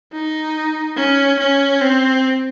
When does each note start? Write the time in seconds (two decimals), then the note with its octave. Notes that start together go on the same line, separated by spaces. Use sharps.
0.13 D#4
0.97 C#4
1.40 C#4
1.81 C4